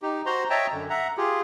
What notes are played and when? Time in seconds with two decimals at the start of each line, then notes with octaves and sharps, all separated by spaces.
0.02 D#4 G4
0.26 F#4 C5 A#5 C6
0.50 C#5 D#5 E5 G5 A5 A#5
0.72 F#2 D3
0.90 E5 F#5 A#5
1.17 F4 G4 G#4